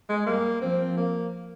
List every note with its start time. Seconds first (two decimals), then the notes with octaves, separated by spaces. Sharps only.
0.09 G#3
0.26 G3 A#3
0.61 F3 C4
0.97 A#3